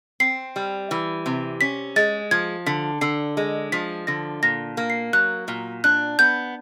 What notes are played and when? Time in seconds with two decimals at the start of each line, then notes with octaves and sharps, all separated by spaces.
0.20 C4 C7
0.56 G3
0.91 E3
1.26 C3
1.61 C#4 B6
1.96 G#3 A6
2.31 F3 G#6
2.66 D3 B6
3.01 D3 C7
3.37 G#3
3.72 F3 B6
4.07 D3 A#6
4.43 A#2 A#6
4.77 A#3
4.90 C7
5.13 F#3 F#6
5.48 A#2
5.84 D4 F#6
6.19 B3 G6